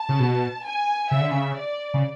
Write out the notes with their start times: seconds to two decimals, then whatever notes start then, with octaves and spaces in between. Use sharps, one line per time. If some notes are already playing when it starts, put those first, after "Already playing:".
Already playing: A5
0.09 C#3
0.20 B2
0.65 G#5
1.11 C#3 E5
1.21 D3
1.31 C#3
1.58 D5
1.94 C#3